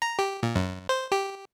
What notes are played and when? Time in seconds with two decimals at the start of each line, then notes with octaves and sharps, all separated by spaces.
0.02 A#5
0.19 G4
0.43 A#2
0.55 F#2
0.89 C5
1.12 G4